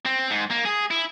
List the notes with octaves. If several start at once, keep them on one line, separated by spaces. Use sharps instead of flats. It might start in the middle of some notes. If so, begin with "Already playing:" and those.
C4
G#2
A#3
G#4
E4